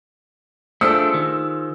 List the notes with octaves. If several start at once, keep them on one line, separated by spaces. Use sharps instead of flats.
A3 D4 F4 G#4 C5 E6
D#3